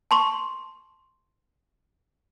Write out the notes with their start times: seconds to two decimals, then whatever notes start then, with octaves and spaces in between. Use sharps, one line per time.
0.11 A5 C6 C#6